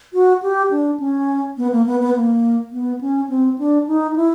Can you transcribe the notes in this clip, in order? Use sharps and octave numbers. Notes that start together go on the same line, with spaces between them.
F#4
G4
D4
C#4
B3
A#3
B3
B3
A#3
B3
C#4
C4
D4
D#4
E4